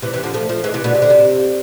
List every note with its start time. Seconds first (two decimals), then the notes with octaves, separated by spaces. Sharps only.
0.02 C3 E3
0.13 C3 E3
0.23 D3 F3
0.34 F3 A3
0.49 F3 A3
0.64 E3 G#3
0.74 C3 E3
0.84 B2 D3
0.95 C3
1.02 D3
1.10 C3